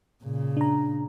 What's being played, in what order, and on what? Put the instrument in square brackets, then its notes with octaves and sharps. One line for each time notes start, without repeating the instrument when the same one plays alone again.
[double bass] A#2 C#3
[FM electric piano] D4 A#5